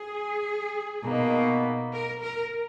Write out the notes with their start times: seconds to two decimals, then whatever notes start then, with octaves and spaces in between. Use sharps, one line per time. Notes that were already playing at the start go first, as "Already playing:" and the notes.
Already playing: G#4
1.04 B2 A#3 D#4
1.92 A#4
2.22 A#4